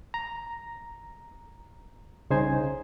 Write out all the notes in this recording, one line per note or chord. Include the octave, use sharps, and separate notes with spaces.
A#5
C2 C#3 D#4 C5 G#5 G#6